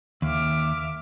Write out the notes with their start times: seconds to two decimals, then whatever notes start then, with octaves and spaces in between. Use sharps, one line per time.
0.22 D#2 E5 D6 F6